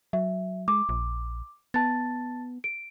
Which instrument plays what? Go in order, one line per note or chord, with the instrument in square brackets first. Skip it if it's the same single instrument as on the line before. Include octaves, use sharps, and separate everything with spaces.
[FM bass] F#3 [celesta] E5
[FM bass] G#3 [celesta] D6
[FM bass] A#1
[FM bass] B3 [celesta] A5 A6
[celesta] D7